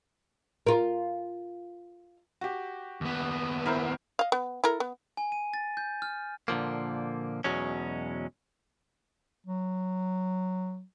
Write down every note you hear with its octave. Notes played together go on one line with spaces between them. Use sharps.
F4 A#4
F#4 G4
D#2 B3
E4 A#4 C5
D#5 F5
B3
E4 A4 A#4
B3
G#5
D#7
A6
G6
F6
A#2 D3 F3 A#3
E2 B2 F#3 G#3 C#4
F#3